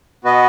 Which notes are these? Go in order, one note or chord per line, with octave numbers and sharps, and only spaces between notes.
B2 B3 F#4 B4 D#5